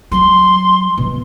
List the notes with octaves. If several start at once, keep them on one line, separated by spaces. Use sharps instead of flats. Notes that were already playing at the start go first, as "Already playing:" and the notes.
F#3 C6
B2 F3